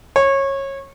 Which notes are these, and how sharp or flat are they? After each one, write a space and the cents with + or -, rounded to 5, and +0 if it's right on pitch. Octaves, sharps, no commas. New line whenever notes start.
C#5 -20